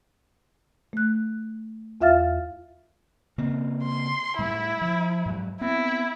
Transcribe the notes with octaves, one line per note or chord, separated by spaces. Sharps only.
A3 F#6
E2 F4 E5 F5 F6 A6
C#3 A#3 C4
C6
A2 G3 A3 E4
F3
G#2 F#3
B3 C4 E4